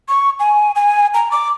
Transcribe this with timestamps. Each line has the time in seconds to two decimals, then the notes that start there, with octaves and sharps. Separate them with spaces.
0.08 C#6
0.39 G#5
0.75 G#5
1.14 A#5
1.31 D6